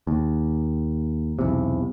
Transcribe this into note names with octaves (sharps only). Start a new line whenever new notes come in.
D#2
B1 E2 C3